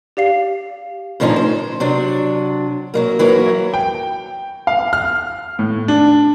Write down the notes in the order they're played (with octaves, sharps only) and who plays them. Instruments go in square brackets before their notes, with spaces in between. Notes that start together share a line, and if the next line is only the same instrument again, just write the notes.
[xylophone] G4 D5 F5 C7
[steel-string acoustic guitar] A2 D3 F3 C#4 D#4
C5
C3 F#3 D4
F#3 G#3 A#3
E3 F#3 A#3 E4
[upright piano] G5
F5
F6
A2
D4